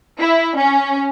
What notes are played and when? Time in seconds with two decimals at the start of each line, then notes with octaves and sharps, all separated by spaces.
0.19 E4
0.57 C#4